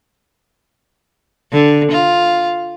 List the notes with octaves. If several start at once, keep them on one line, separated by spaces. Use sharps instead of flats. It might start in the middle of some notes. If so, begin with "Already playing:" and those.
D3
F4